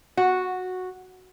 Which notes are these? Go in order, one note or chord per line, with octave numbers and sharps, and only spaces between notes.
F#4